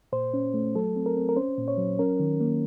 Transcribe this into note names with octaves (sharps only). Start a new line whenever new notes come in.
A#2 C5
C#4
A3
F#3 A4
C4
A#4
C4
A#4
C#4 C5
A#2
C#5
F#3
C#4 A#4
D#3
A#3